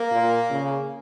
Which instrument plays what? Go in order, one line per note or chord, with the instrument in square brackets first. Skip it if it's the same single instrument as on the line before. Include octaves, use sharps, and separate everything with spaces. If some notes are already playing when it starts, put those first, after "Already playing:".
Already playing: [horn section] A#3
[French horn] A#2
C#3